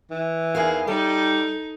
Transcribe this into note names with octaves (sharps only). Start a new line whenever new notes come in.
E3
E2 D#3 G#4 F5
G3 D#4 A4